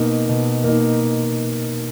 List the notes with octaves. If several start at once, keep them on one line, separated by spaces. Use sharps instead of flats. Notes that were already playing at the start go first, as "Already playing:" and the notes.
Already playing: B2 A#3 D#4
B2
A#3 D#4